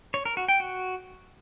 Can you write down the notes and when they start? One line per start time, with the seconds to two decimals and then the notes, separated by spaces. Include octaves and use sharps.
0.14 C#5
0.25 A#4
0.37 F#4
0.48 G5
0.60 F#4